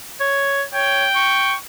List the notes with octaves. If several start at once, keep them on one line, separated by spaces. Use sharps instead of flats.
C#5
C#5 G5
C#6